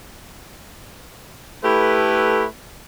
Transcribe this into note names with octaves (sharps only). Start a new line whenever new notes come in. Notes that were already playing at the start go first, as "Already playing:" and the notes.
A3 E4 G4 A4 B4